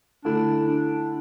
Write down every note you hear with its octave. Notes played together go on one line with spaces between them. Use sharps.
D3 A3 D4 E4 A4
D4